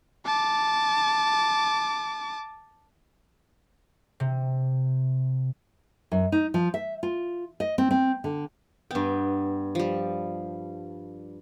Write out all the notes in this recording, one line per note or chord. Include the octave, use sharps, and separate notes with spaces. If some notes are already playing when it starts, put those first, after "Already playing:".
A5 D6
C3
F#2
D#4
F3
E5
F4
D#5
C4
C4
D3
G2 B3 G5
F3 G3